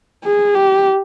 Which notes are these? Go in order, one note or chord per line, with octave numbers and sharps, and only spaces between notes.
G#4
G4